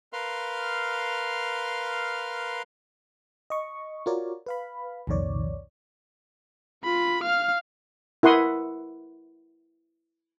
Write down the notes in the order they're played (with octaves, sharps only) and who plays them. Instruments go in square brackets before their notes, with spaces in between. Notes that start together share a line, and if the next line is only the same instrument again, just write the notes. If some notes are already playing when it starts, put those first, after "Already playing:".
[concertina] A#4 B4 F5 C6 F6
[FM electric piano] D#5 C#6
F4 F#4 A#4 C#5 D5
B4 F5 B5
C2 F2 A#2 D#3 C#5 D5
[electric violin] F4 B5
F5 F6
[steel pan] E4 A#4 F#5 C6 D#6